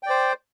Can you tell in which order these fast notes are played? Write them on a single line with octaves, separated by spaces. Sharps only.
G5 D5 C5